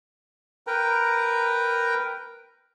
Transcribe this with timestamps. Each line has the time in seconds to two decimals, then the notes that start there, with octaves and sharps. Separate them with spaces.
0.67 A#4 B4 G5 A#5